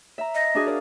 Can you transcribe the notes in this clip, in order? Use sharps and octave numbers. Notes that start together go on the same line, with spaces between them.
E5 A#5
D#5
D4 F#4 G#4
A#4 D5 F5